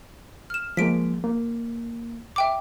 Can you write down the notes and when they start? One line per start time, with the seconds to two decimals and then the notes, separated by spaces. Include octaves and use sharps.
0.50 F6 E7
0.77 F3 G#3 A#3 B6 D7
1.24 A#3
2.36 E5 G5 D6